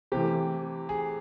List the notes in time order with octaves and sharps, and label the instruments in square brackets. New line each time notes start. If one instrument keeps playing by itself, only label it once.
[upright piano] C3 E3 A3 [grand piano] G4
[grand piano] G#4